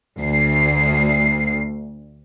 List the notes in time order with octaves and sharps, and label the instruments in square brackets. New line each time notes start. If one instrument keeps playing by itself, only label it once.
[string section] D2 C7